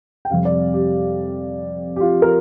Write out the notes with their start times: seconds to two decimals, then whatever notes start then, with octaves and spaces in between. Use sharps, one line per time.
0.25 G5
0.30 F2 C3 G3 F5
0.45 D5
0.74 G4
1.96 G4
2.00 F4
2.22 A#4